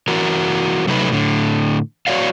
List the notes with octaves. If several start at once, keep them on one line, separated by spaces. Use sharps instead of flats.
E3 F#4 A#4
C3 F#3 A3 D4 D#4 B4
A2 D3
F#4 C#5 D5 F5